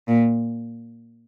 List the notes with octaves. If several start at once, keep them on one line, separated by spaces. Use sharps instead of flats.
A#2